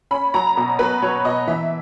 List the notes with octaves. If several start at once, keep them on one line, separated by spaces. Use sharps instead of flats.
C#4 B5
F#3 A#5
B2
F#3 B4
F#3 C#5
B2 D#5
E3 E5